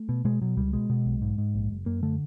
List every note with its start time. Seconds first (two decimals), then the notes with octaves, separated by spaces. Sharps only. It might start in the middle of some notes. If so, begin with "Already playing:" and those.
Already playing: A3
0.09 B2
0.25 B2 G#3
0.42 B2 F#3
0.57 C#2 G3
0.73 B2 G#3
0.90 B2
1.06 B1
1.22 G#2
1.38 G#2
1.54 A#1
1.71 F#1
1.86 F#2 A#3
2.03 D3 A3